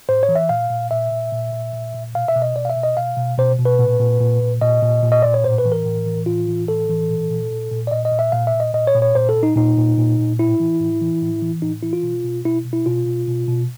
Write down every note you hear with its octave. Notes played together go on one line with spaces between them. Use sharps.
A2 C5
C#5
E3
E5
A#2 F5
A#2
A#2 E5
A#2
A#2
A#2
A#2
A#2
B2 F5
E5
B2
D#5
B2 D5
F5
E5
B2
D#5
B2 F5
B2
B2 C5
B2
B4
A#2
A#2
A#2
A#2
A#2 D#5
A#2
A#2
D#5
A#2 D5
C#5
A2 C5
B4
E3
A#4
A2
E3
A2 F4
E3
A2 A4
E3
A#2
A#2
A#2
A#2
D5
A#2 D#5
D#5
A#2
E5
A#2 F5
E5
A#2
D#5
A#2 D#5
C#5
A#2
C#5
A#2 C5
A4
A#2
D#4
A#2 D#4
A#2
A#2
A#2
A2 E4
E3
A2
E3
A2
E3
A2 D#4
E3 E4
F4
B2
B2
B2 E4
B2
E4
B2 F4
B2
B2
B2